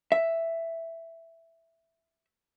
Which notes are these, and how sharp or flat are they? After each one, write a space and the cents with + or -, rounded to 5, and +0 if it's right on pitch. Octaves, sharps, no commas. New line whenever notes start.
E5 +5